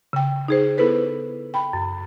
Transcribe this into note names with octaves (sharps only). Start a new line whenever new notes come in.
C#3 G5
D#4 G#4 C5
B3 E4 A4 B4 C5
G5 B5
F#2